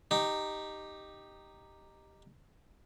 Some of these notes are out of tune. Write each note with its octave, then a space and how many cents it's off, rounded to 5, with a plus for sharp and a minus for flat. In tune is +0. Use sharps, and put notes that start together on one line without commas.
D#4 -10 G4 +0